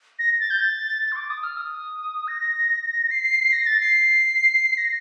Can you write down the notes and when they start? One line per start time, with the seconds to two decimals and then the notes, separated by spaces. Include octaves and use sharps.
0.19 A#6
0.40 A6
0.50 G6
0.61 A6
1.02 A6
1.12 C6
1.16 D6
1.30 D#6
1.43 F6
1.57 D#6
2.28 A#6
3.11 C7
3.52 A#6
3.66 A6
3.80 C7
4.77 A#6